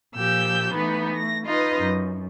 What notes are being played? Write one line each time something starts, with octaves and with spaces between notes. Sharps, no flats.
A#2 F3 G4 E6 G6
E3 A3 B3 D#4 B4
A3 A#6
D#4 F4 B4 D#5
F#2